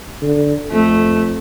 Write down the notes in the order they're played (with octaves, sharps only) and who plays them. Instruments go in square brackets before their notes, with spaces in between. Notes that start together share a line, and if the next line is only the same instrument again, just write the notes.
[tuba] D3
[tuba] F2 [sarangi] A3